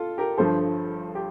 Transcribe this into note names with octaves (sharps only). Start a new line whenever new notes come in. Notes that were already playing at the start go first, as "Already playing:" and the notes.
Already playing: F4 A4
G4 A#4
G1 G2 F3 A4 C5
G4